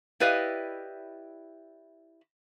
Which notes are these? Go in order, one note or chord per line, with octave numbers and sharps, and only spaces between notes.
E4 G4 B4 D5 D#5 F5